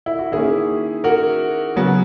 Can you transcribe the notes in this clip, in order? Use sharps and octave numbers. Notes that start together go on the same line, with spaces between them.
E4
F#4
D#3 A#3 C#4 E4 G#4
F#4 A#4
C#3 F#3 B3